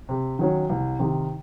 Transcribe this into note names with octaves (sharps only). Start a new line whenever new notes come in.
C3
D#3 F#3 C#4
C2
C3 D#3